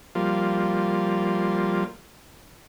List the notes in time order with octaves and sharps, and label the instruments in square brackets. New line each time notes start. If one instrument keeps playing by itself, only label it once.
[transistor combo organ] F3 G3 A#3 F4